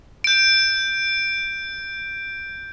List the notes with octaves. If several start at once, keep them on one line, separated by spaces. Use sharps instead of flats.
G6 D7